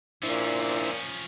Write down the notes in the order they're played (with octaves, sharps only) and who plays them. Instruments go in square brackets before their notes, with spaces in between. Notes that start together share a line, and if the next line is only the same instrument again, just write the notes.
[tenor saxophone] A#2 [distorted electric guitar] F3 C#4 [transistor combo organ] D4 E4 C5